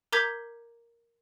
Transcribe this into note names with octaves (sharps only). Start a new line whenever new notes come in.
A#4 A#5 D6 G6 G#6 B6